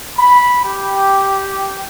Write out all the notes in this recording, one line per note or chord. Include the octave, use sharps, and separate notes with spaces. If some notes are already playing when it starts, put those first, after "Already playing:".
B5
G4